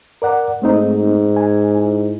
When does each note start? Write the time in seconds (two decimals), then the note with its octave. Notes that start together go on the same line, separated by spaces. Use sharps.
0.22 A#4 D5 F#5
0.62 G#2 A3 C4 D#4
1.37 G#5
1.77 E4